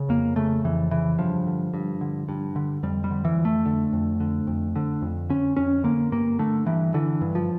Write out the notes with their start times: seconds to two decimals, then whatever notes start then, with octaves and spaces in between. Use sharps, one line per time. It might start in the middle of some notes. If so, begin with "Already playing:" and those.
Already playing: C#3
0.09 F2 A#3
0.36 C#3 A3
0.64 F2 E3
0.91 C#3 E3
1.19 G2 F3
1.47 D3
1.74 G2
2.01 D3
2.29 G2
2.56 D3
2.83 F2 G3
3.04 G3
3.11 D3
3.25 E3
3.38 F2
3.45 A3
3.65 D3
3.93 F2
4.20 D3
4.47 F2
4.76 D3
5.02 F2
5.30 D3 C#4
5.57 F2 C#4
5.84 D3 A#3
6.12 G2 A#3
6.39 D3 A3
6.66 G2 E3
6.94 D3 E3
7.21 G2
7.35 F3